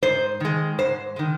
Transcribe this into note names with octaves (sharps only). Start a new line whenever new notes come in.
G#2 C5
D#3 G#3
G#2 C5
D#3 G#3